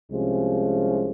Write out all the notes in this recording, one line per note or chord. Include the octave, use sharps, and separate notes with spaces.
C2 C3 F3 G#3 C#4